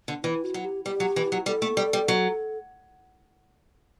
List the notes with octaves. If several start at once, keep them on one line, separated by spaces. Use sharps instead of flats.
D3
E3 E4
F#4
F#3
G4
G3 G4
F#3
E3
F#3
G3 A4
A3
G3
G3
F#3